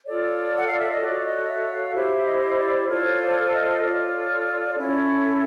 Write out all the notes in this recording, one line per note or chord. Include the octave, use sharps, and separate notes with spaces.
F4 A4 C#5 D5
F#5
F5
E5
D#5
F#4 A4 C#5 D5
D#5
E5
F5
E4 G4 C5 E5
D#5
D5
F4 A4 C5 C#5
D5
D#5
F4 A4 C#5 D5
C#4 E4 A4 C#5